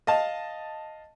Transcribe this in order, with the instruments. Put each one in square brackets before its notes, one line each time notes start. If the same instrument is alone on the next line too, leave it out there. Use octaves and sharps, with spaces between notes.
[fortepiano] D#5 F5 A5